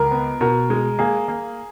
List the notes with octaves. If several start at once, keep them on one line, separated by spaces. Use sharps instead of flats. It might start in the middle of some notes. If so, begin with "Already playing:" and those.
Already playing: C#2 A#4
B3
B2 A#4
G#3
A#3 G#4
A#3